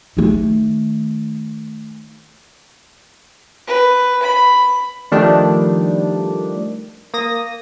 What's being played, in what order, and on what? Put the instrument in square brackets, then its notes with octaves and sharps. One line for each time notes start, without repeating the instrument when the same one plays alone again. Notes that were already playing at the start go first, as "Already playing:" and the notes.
[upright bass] D#3 A3
[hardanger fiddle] B4
B5
[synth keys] D#3 F3 G3 A3 D4
A#3 D#6 A#6